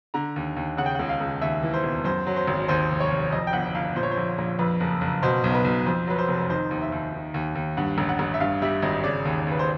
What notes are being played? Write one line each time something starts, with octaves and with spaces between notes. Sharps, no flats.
D3 A#5
D#2
D#2
C#3 F#5
G5
C#2 F#5
F5
C#2
D#2 E5
E3
C5
E1
F#2 C5
F#3
C5
G#1
D#2 C5
F1
C#5
F1
F2 D#5
G5
G1 F#5
G1 F5
A#2 C5
C#5
C5
A#1
A#1
F2 B4
F#1
F#1
B2 C5
B1
B4
B1
F2 C5
F#3 B4
C5
F1
D#3 C5
D#2
E5
D#2
D#3
D#2
D#2
G2 F#5
A1
F#5
A1
E5
G2 F5
G3 E5
G#1 D#5
C#3 D5
D#2
D#2 B4
C5